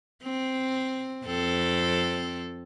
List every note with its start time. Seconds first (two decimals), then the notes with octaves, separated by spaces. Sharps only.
0.23 C4
1.25 F2 C4 A4